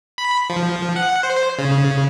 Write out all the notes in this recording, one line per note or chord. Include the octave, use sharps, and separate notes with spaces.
B5
F3
F#5
C5
C#3